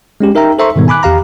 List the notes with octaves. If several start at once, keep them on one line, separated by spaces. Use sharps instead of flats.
G#3 C#4 G4
D#4 A#4 E5 G5 A#5
A4 C5 E5 A#5 C6 C#6
G#2 B2 D#3 G3 B3
G#5 B5 D6 F#6
E2 G4 F5 A#5